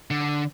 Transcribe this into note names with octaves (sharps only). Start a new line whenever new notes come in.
D3